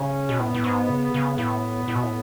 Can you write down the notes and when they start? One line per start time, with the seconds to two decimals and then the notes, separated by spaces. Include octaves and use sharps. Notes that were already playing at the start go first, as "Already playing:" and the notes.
Already playing: C#3 C#4
0.29 B2
0.39 A2 B3
0.54 A2
0.64 G#2
0.89 C#3
1.14 C#3
1.38 A2 B3
1.88 A2
1.95 B2
2.03 A2